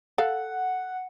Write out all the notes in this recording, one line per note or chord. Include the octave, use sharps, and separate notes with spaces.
A4 F5 F#5